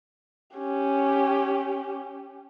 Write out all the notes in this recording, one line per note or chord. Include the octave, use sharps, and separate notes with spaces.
C#4 G4